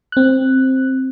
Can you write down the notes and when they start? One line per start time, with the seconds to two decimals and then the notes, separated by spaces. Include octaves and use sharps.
0.12 C4 F#6